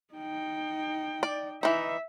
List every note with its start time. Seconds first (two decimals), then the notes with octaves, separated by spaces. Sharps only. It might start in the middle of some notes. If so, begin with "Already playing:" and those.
0.14 D#4 G5
1.23 D5
1.63 E3 D#4 E5